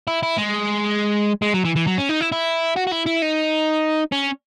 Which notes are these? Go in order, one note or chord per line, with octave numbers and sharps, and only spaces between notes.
E4
E4
G#3
G#3
F#3
E3
E3
F#3
C#4
D#4
E4
E4
F#4
F#4
E4
E4
D#4
C#4